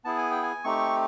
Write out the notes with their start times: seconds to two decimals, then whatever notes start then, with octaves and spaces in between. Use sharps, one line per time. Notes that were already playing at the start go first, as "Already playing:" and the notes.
0.05 B3 E4 G#4 A5
0.18 G#5
0.31 G5
0.43 G#5
0.64 A3 C4 D#4 G4 C#6